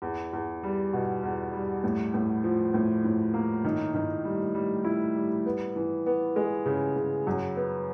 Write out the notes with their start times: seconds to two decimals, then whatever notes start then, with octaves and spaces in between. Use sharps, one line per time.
0.02 E2
0.33 E2
0.63 G3
0.93 B2
1.23 E2
1.53 G3
1.84 A2
2.14 A2
2.44 F3
2.74 A2
3.04 A2
3.34 A#3
3.64 D#3
3.95 D#3
4.25 G3
4.55 G3
4.85 E4
5.15 G3
5.46 B3
5.76 E3
6.06 B3
6.36 G#3
6.66 C#3
6.96 C#3
7.27 F#2
7.56 B3